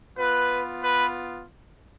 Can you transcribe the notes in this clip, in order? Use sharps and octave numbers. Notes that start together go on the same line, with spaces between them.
B3 F4 B4
B4